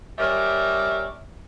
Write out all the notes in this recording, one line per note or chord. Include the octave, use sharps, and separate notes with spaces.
G3 C#4 A#4 D5 E5